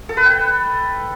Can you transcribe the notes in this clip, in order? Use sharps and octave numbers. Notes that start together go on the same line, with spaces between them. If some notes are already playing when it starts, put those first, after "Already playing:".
A4
B4
G5